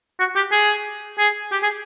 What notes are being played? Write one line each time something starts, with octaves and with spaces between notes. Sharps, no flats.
F#4
G4
G#4
G#4
G4
G#4